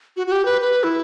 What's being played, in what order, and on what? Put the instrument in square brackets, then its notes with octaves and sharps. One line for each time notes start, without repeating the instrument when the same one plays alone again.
[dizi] F#4
F#4
G4
B4
B4
E4